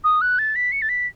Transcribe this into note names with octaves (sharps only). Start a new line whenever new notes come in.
D#6
F#6
A6
B6
C#7
A6
B6